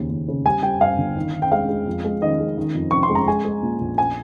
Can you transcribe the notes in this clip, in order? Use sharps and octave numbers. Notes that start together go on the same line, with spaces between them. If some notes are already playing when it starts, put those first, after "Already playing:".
Already playing: D#2 C#3
D#2
C#3
G3 G#5
G3 G5
G2 F5
G1
D#3
D#3
G5
G#3 F5
G#3
F2
G#3
D#3 D#5
G#3
D#3
F2
F1 C#6
C6
G#3
A#5
G#3 G#5
G#3
A#2
A#1
G#5